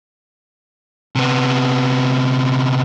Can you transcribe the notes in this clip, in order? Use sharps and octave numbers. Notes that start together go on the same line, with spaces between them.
C3 B3